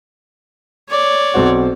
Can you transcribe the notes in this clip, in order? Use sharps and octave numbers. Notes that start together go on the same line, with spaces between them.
C#5 D5
B1 C4 F#4